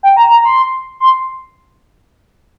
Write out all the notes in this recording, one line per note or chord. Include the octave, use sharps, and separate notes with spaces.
G5
A#5
A#5
C6
C6